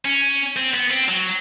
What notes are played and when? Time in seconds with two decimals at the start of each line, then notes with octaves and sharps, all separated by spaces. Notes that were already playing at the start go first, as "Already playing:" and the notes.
0.05 C#4
0.56 C4
0.74 B3
0.91 C4
1.09 F#3